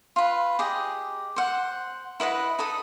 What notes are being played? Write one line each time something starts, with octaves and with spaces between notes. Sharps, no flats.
F4 B4
G4 G#4 D#5
C5 F#5
E4 B4 D#5 F#5
D#4 A4 D#6